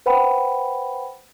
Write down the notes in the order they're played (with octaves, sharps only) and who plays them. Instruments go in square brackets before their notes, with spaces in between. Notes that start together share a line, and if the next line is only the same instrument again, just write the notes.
[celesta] B4 C5 F#5 G5 B5